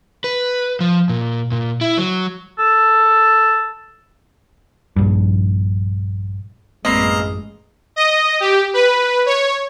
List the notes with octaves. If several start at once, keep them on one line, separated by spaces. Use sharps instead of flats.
B4
F3
A#2
A#2
E4
F#3
A4
A#1 G2
A1 F#2 G#3 A#3 C4 B4 D#5 A#5
D#5
G4
B4
C#5